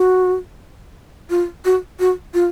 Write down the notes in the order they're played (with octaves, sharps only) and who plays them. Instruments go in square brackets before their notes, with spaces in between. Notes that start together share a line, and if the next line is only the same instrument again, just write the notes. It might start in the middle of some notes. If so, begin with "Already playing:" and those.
Already playing: [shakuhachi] F#4
F4
F#4
F#4
F4